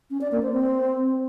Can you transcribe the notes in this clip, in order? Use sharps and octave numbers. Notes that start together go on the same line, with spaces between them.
C#4
D5
A#3
C5
C4